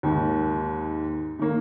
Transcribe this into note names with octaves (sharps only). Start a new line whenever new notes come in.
D#2 G#2
D#3 A#3